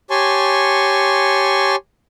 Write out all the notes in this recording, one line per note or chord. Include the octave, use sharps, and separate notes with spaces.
G4 C#5 G#5 A5 C6 C#6